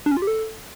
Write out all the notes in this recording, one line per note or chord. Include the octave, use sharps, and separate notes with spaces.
D4
C#4
F4
G4
A4